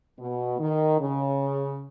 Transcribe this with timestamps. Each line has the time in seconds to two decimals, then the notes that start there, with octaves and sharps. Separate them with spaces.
0.18 B2
0.58 D#3
0.99 C#3